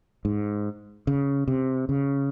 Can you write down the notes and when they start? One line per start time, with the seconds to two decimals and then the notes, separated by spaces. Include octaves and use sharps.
0.25 G#2
1.07 C#3
1.48 C3
1.89 C#3